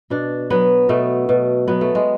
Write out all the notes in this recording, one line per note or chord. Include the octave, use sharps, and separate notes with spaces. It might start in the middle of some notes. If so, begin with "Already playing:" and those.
B2 D4
F#3 B3
B2 A3
B2
F#3 B3
A3
G#3